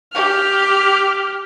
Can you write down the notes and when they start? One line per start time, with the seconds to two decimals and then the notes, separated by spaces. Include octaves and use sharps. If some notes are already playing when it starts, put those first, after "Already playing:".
0.13 G4 F6